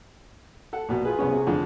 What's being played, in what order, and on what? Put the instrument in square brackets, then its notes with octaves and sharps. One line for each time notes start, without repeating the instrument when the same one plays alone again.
[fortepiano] A4 F#5
A#1 B2
[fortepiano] F4 B4 [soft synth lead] G#4
[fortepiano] C2 B3 C#4
C3
F2 D3